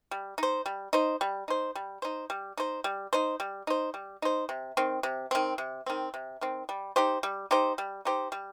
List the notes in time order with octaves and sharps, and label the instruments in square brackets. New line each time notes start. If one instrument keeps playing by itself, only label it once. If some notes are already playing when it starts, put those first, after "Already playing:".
[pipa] G3
D#4 C5
G3
D#4 C5
G3
D#4 C5
G3
D#4 C5
G3
D#4 C5
G3
D#4 C5
G3
D#4 C5
G3
D#4 C5
C3
D#3 C4
C3
D#3 C4
C3
D#3 C4
C3
D#3 C4
G3
D#4 G4 C5
G3
D#4 G4 C5
G3
D#4 G4 C5
G3